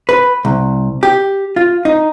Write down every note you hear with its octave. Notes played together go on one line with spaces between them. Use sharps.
B4
C2
G4
F4
D#4